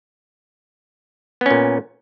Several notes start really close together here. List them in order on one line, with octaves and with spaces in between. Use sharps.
B3 C#4 A#2